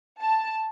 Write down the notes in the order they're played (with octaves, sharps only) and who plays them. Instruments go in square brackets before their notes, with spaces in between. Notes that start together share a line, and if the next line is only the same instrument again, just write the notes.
[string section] A5